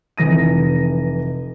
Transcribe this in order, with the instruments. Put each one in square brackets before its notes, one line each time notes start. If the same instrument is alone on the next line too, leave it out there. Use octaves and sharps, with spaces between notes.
[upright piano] F1 E3 A#6 D#7